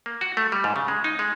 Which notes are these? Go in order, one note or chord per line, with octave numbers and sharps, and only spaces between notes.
A#3
F#4
A3
G3
G#2
C#3
G#3
D#4
G#3